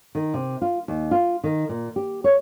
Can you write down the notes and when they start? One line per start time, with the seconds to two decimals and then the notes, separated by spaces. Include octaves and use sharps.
0.15 D#3
0.34 C3
0.62 F4
0.88 D#2
1.11 F4
1.44 D#3
1.69 A#2
1.96 G4
2.24 C#5